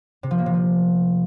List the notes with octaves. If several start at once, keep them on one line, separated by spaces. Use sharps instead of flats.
C3
F3
A#3
C3
F3